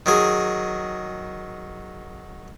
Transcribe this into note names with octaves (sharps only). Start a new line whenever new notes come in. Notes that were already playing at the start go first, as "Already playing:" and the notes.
D#3 F#3 G#4